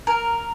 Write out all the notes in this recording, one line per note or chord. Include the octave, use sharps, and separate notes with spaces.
A#4